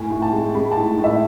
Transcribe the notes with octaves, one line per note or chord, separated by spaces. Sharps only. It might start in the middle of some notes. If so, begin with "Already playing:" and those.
Already playing: A2 G#5
A2
A5
G#3
G#3 B5
A5
A2
A2
E5